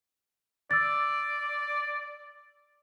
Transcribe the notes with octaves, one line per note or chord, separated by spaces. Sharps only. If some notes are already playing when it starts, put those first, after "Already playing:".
D5 E6 A6